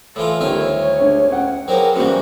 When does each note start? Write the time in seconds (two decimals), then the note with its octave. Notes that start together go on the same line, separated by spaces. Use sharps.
0.16 A2 E3 F4 A4
0.40 D2 D#3 G3 F4 C#5 E5
1.01 D3 G#3
1.31 C#4 F#5 G5
1.68 F#3 A#3 B3 G#4 C5 G5
1.96 G#2 E3 G3 A#3 C#4 F#4